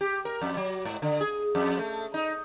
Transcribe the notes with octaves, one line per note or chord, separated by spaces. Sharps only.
G4
A#4
F2
F#3
G#2
D3
G#4
F2
A3
D#4